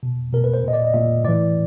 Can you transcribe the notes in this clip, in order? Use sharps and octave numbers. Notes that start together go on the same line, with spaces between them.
B2
B2 A#4
B4
C5
A#2 D#5
D5
D#5
A#2 E5
A2 E3 D5